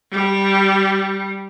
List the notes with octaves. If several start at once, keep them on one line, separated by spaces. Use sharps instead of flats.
G3